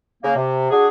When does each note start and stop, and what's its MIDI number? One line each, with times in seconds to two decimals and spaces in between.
0.23 0.33 49
0.23 0.33 58
0.36 0.70 48
0.71 0.88 62
0.71 0.88 66
0.71 0.88 68